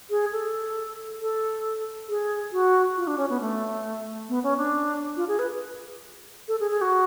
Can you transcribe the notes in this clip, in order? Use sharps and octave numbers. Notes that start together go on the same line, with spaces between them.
G#4
A4
A4
G#4
F#4
F4
D4
C#4
B3
A3
B3
C#4
D4
F4
G#4
B4
A4
G#4
G#4
F#4